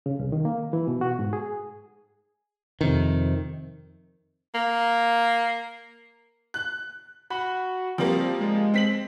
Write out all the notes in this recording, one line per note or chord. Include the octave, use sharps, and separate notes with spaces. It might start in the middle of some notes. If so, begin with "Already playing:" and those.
C#3
C2
D#3
A#3
E3
B2
F#4
G#2
G#4
F2 C3 D#3
A#3
F#6
F#4 B5
F3 G3 A#3 C4
G#3
C4 B6 F#7